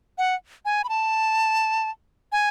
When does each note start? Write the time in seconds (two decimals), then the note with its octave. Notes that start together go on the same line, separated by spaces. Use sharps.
0.18 F#5
0.65 G#5
0.84 B5
0.89 A5
2.32 G#5